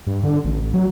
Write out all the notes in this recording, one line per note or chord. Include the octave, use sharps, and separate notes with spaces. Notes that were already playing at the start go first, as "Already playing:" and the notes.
G2
D3
A1
F#3